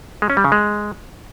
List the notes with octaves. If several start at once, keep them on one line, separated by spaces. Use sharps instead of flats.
G#3
C#4
G3
C#3
G#3